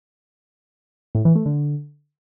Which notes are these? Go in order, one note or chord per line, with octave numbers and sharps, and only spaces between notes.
A2
E3
A3
D3